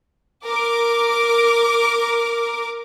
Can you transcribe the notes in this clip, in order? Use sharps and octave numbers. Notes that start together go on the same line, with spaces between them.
A#4 D6